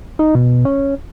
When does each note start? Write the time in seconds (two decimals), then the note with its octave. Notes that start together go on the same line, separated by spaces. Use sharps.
0.19 D#4
0.35 B2
0.65 C#4